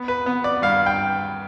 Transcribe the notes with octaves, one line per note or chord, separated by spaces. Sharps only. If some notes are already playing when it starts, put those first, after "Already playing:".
Already playing: B3
B4
B3
D5
G2 F5
G5